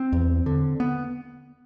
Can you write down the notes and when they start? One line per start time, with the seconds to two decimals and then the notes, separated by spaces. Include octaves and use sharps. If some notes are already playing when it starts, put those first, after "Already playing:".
Already playing: C4
0.12 E2
0.46 D3
0.80 B3